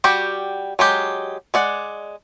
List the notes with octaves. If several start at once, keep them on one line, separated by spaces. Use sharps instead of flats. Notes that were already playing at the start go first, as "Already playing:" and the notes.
G3 F#4 G4 G5
F#3 G#3 G4
G#3 D5 F#5